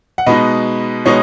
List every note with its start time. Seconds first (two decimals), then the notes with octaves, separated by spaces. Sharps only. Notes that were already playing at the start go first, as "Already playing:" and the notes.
0.18 F#5
0.26 B2 G#3 B3 D#4 B4 D#5
1.06 B2 G#3 B3 D#4 C#5